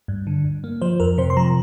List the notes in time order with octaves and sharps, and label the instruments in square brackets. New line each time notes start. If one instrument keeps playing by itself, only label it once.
[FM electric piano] G2
D3
G2
A#3
F3 C5
F2 A#4
C3 C5
C6
F3 A#5